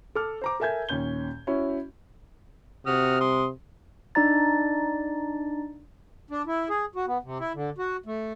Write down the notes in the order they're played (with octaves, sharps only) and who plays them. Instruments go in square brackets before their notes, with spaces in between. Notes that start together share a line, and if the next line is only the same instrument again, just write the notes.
[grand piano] A4 D6 F6
C5 A#5 D6
A4 A#4 E5 G#5 G6 G#6
D#2 A#2 C#4 G6 G7
C#4 E4 F#4 C#5
[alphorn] C3 [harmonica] F#4 D#6 F6
[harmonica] C6 D#6
[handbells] D4 D#4 D5 A#5 A6
[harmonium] D4
E4
G#4
F#4
B3
C3
E4
D3
F#4
A3